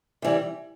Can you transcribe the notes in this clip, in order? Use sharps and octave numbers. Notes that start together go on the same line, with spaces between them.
C3 E3 G3